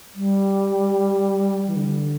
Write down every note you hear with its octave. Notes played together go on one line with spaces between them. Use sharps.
G3
E3
D3